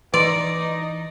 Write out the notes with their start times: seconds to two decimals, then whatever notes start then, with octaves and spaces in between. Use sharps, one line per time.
0.14 E3 D#4 B4 D5 C6